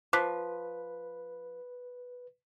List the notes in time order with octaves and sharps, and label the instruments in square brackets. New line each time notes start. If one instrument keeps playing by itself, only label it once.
[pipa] F3 [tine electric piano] B4 [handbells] D6 F#6 B6